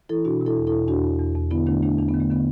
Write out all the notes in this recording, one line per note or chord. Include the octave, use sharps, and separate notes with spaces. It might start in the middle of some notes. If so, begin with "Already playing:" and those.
E3 E4 A4
B2 D4 F#4
B2
E4 A4
E2
E4 A4
B2
E2 D4 F#4
E2
E2
E2
D3 B3 E4
D3 A3 D4
D3 A3 D4
E2 D4
B3
D3
A3
D3 B3